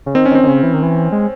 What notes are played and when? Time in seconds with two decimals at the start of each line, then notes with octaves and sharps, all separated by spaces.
0.06 C#3
0.15 D#3 C4
0.26 C#4
0.31 D#3
0.35 C4
0.43 D#3
0.47 C#3
0.63 E3
0.74 D#3
0.83 E3
1.12 G#3